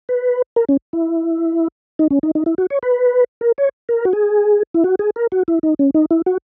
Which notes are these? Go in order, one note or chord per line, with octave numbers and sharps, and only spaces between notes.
B4
A#4
C#4
E4
D#4
C#4
D#4
D#4
E4
F#4
C#5
B4
A#4
C#5
A#4
F#4
G#4
E4
F#4
G#4
A#4
F#4
E4
D#4
C#4
D#4
E4
F#4